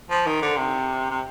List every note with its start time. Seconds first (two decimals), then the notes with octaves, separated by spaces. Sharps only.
0.10 F3
0.26 D#3
0.41 D3
0.57 C3
1.10 C3